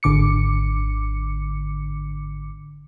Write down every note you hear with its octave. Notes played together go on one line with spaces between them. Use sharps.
G#1 D3 D6 C#7